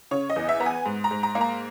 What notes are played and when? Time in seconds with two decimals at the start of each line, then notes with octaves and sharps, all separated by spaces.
0.11 C#3 C#5
0.30 D#5
0.36 E2
0.49 E5
0.60 B3 A#5
0.66 G#5
0.85 G#2
1.04 A#5
1.11 G#2
1.23 A#5
1.35 A#3
1.41 A#5